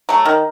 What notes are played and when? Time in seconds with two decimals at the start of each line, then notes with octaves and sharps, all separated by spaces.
0.09 F#3 A3
0.25 D#3